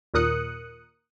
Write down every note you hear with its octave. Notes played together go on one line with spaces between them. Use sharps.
D#2 A#2 A#4 D#6 F#6 C#7